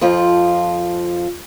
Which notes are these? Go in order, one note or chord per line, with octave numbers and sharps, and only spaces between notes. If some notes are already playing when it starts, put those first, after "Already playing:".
F2 F3 F4